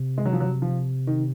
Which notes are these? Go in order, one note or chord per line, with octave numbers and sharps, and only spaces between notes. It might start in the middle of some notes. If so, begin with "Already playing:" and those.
Already playing: C3
G#3
F#3
F3
F#3
F3
D#3